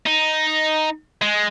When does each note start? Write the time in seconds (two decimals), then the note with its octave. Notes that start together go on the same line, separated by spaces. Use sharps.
0.06 D#4
1.22 G#3